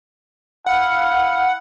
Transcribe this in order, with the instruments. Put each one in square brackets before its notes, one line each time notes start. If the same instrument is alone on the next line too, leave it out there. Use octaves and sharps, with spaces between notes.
[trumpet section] E4 F5 [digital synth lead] F#5